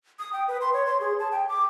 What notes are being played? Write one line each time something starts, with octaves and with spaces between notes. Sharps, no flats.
D#6
G5
B4
C6
C#5
C6
G#4
A5
G5
D6